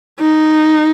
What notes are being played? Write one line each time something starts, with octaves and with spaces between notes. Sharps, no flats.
D#4